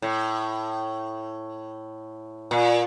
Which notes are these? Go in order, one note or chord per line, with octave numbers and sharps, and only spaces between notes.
A2
A#2